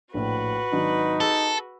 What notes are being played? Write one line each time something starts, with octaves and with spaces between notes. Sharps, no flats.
A#1 A2 F#4 B4
G#1 F#3 D4 D#4
G#4 A4 E6